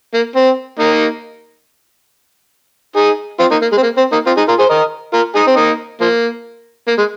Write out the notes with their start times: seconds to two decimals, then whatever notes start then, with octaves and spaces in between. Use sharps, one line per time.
0.14 A#3
0.36 C4
0.79 A#3 D#4
2.96 D#4 G#4
3.40 C4 F4
3.51 A#3 D#4
3.62 A#3
3.72 G#3
3.78 C4
3.83 A#3
3.97 C4
4.12 A#3 D#4
4.26 C4 F4
4.37 D#4 G#4
4.48 F4 A#4
4.59 G#4 C5
4.70 A#4 D#5
5.14 F4 A#4
5.35 D#4 G#4
5.47 C4
5.56 A#3 D#4
6.01 F3 A#3
6.88 A#3
6.98 G#3